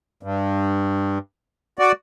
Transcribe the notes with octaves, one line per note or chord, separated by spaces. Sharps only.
G2
F#4 D5